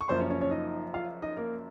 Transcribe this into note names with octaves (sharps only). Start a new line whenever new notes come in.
C#6
F#1 F#2 F3 C5 C6
C#4 C#5
C#4 C#5
C#4 C#5
D#4 D#5
F4 F5
D#4 D#5
A#3 A#4